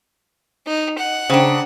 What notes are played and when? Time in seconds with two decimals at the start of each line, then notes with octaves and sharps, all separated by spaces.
0.67 D#4
0.98 F#5
1.30 C#3 D4 C5 G5 A#5